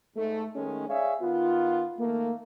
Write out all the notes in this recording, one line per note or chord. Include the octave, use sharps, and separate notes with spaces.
G#2 A3
D#3 G#3 A3 C#4
G#4 C#5 D5 E5 F5
D#3 B3 F4
D#3 A3 A#3